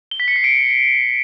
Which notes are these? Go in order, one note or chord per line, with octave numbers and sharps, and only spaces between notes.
G7
B6
C#7
C7
D7